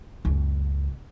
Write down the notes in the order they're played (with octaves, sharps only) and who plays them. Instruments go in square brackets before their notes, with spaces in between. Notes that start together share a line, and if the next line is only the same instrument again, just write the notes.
[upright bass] F#1 C#2